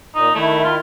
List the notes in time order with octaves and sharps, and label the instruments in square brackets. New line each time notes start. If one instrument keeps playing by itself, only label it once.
[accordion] A#2 [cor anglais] D#4
[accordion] D#3 E4 [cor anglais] A3
[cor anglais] F4